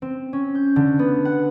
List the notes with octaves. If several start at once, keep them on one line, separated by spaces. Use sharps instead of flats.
C4
C#4
G6
D3
B3
F#5